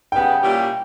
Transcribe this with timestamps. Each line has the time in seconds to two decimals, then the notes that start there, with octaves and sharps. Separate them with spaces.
0.12 C#3 G3 B3 G5
0.43 A#2 G3 C#4 E4 G4